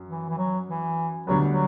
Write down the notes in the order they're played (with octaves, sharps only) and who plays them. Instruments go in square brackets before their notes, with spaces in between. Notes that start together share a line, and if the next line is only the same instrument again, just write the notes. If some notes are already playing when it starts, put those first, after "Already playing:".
Already playing: [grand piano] F#2
[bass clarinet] E3
E3
F#3
E3
[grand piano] D2 D3 G3 B3 [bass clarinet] F#3
[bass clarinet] F#3